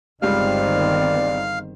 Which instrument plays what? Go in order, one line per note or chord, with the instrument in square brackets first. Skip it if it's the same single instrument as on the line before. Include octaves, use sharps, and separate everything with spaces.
[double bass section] G1 D#3 C4 [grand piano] C#2 G3 [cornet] D5 [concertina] F5 F6